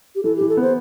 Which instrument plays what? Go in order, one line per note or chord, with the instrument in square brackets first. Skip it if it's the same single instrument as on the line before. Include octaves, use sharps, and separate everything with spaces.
[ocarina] G4
[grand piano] E3 [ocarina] A4
[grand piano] E3 [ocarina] G4
[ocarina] A4
[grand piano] B3 [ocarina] C5